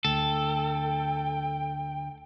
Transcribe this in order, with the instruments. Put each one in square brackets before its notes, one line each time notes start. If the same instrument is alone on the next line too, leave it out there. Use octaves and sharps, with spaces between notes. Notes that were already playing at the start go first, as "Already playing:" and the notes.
[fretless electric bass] D2 [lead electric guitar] A4 [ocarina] G5